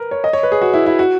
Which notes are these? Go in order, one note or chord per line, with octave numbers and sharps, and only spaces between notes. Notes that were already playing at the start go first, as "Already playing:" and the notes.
Already playing: A#4 B4
C#5
D#5
C#5
B4
G#4
F#4
E4
E4
F#4